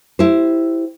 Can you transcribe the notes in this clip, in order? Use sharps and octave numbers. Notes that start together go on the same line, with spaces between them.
E4 G4 C5